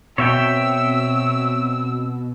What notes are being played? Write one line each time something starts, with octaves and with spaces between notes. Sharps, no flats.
B2 C4 C#5 E5 G5 E6